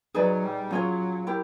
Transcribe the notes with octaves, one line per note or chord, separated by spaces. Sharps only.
F#3 D#4 G#4 B4 D5
G3
F#3 C#4 F4 G#4 C#5
E4 G4 A#4